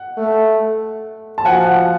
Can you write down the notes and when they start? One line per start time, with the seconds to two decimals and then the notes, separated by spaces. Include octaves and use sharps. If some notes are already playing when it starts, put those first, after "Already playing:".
Already playing: F#5
0.17 A3
1.38 A5
1.45 F3 F#5 G#5